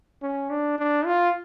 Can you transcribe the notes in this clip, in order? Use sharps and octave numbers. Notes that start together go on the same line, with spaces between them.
C#4
D4
D4
F4